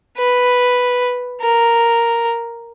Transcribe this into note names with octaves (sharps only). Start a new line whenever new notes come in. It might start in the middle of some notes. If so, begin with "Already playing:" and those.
B4
A#4